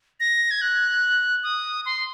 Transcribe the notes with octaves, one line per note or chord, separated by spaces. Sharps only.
A#6
G#6
F#6
D#6
C6